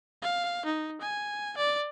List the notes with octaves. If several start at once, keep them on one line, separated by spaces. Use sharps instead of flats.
F5
D#4
G#5
D5